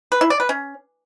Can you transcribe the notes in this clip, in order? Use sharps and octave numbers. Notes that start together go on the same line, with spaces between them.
B4
E4
D5
B4
C#4